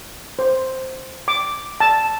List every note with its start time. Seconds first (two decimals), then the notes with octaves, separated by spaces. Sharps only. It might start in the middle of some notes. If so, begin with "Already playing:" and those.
0.39 C5
1.28 D6
1.80 A5